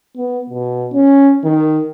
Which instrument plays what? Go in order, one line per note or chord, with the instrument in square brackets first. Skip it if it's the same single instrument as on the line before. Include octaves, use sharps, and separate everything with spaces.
[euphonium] B3
B2
C#4
D#3